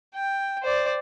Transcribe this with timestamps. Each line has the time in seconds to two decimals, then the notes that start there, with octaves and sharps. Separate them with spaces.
0.15 G5
0.63 C5 D5